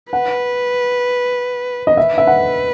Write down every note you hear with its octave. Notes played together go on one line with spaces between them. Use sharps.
B4 F#5
D#5
B4 E5
E5
F#5